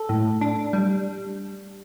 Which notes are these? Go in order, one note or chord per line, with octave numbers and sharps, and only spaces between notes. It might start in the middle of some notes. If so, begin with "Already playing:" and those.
Already playing: A4
A2
D4
G3